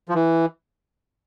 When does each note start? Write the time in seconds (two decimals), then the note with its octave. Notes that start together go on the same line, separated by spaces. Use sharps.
0.09 F3
0.14 E3